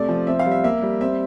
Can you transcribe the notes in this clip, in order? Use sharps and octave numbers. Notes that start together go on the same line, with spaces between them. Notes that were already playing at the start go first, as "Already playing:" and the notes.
Already playing: C3 A3 D5
F3
C4 E5
F5
G3
E5
A#3 E5
G3
C4 E5